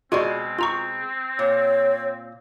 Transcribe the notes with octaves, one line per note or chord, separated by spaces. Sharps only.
B2 G#3 C4 F4 F#4 D5
F4 A#5 C#6
A#2 C#5